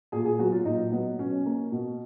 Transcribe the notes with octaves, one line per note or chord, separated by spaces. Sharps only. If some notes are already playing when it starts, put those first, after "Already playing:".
A#2 G#4
G#4
F#3 B3 F#4
F4
A#2 D#4
F#3 B3
B2 C#4
A#3
B2